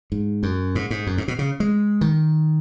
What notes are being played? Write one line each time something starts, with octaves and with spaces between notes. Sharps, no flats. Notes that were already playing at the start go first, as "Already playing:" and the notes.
G#2
F#2
G#2
G#2
F#2
G#2
B2
C#3
G#3
D#3